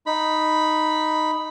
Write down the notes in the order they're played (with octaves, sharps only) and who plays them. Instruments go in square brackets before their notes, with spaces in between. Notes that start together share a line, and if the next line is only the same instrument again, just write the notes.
[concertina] D#4 B5